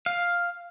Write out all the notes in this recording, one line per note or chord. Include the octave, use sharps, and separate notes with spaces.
F5